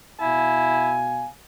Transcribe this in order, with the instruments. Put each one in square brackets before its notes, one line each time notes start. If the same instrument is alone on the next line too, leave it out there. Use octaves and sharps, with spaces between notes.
[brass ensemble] B2 F5 G#5 [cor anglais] E4